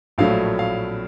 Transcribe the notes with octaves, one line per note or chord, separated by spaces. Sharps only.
A#1 A2 F#3 A3 F5
F5